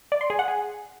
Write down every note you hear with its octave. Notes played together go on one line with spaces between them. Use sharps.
D5
C6
G#4
F#5
G#4